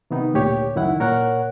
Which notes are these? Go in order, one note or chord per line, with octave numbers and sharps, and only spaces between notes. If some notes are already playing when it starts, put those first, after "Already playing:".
C3 D#3 B3 D#4
D2 A#2 G4 C#5
C#2 F#2 D#3 E4 F#5
A#2 A#4 C#5 F#5 F#6